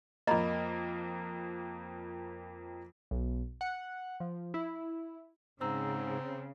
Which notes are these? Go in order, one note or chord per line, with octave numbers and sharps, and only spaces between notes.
F2 A#3 D#5 A#5 B5
B1
F#5
F3
E4
G#2 C#3 C4 A#5 E6